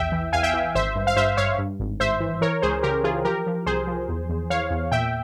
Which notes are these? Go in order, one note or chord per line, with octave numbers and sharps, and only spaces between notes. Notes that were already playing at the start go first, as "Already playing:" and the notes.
Already playing: A#1 E2 E5 G5
E3
E2 F5 G#5
E5 G5
E3
G#1 C5 E5
G2
F5
G2 C5 E5
G2 C#5 F5
G2
G#1
G#1 C5 E5
E3
E3 A#4 C#5
C#2 G#4 C5
C#3 G4 A#4
E3 F4 G#4
F3 G4 A#4
F3
C2 G#4 C5
F3
E2
E2
E3 C#5 F5
E2
A#2 E5 G5